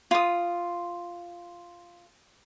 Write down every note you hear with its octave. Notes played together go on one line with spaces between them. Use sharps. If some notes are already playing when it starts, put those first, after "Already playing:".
F4 D#6